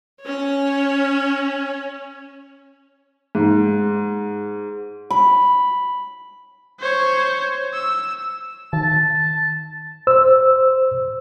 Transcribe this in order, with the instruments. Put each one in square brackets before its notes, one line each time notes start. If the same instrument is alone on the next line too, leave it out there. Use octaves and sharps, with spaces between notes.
[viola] C#4 C#5
[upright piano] G#2
[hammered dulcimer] B5
[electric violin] C5 C#5
E6
[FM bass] D#3 [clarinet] A5
[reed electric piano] C5 E6